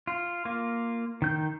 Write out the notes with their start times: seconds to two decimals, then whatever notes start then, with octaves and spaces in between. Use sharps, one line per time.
0.07 F4
0.45 A#3 F4
1.22 D#3 G6